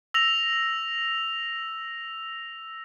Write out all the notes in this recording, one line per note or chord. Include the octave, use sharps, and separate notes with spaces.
E6 A#6 F7